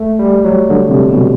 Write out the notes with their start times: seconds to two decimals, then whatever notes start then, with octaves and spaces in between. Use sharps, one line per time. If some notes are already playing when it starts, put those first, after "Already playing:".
Already playing: A3
0.19 G3
0.44 F#3
0.70 D3
0.89 C3
1.09 B2